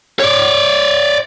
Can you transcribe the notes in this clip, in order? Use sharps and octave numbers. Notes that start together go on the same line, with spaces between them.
C#5 D5